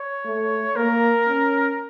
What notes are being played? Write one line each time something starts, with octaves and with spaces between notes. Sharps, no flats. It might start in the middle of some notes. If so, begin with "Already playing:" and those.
Already playing: C#5
A3
A#3 A#4
C#4